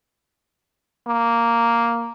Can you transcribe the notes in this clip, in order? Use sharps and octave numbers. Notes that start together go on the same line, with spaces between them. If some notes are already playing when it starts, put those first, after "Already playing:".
A#3